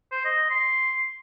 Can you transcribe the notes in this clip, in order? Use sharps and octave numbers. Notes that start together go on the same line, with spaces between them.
C5
D#5
C6